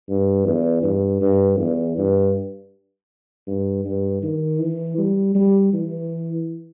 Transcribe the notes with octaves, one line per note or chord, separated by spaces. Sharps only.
G2
E2
G2
G2
E2
G2
G2
G2
D#3
E3
G3
G3
E3